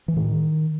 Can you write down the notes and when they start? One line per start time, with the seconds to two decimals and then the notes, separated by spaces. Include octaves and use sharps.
0.08 E3
0.16 A2 D#3